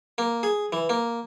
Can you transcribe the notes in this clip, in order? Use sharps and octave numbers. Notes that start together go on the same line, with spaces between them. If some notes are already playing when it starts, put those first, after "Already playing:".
A#3
G#4
E3
A#3